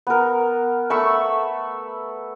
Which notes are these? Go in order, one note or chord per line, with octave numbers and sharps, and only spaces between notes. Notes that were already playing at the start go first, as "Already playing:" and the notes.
B3 A#4
A3 B5 C#6 E6